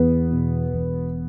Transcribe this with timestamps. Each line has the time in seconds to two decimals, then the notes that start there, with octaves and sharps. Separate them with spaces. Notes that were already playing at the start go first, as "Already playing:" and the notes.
Already playing: E2 B3 B4
0.31 B2
0.73 E1